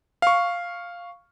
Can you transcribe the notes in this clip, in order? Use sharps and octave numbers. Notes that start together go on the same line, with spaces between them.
F5 C#6